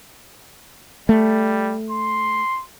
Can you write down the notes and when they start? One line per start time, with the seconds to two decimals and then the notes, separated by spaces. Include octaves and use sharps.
1.09 G3 A3
1.91 C6